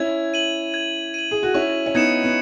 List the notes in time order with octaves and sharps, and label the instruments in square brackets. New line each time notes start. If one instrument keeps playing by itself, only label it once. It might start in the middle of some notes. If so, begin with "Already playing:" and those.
Already playing: [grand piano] C#4 E4 [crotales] G#6
[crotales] D#7 F#7
G#6
D#7 F#7
[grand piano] G#4
F#4
[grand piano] C#4 E4 [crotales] C#6
[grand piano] C#4
[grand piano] B3 D#4 [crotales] G#6 C#7 E7
[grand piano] B3